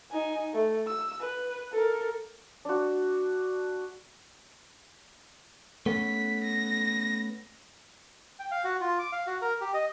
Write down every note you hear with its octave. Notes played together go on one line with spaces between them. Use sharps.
D#4 G#5
A3
E6
B4
A4 A#4
D4 F#4
A3 B3 C#4 B6
A#6
G5
F5
F#4
F4
D6
F5
F#4
A#4
G4
D#5